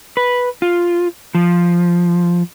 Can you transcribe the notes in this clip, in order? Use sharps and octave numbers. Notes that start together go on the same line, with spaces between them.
B4
F4
F3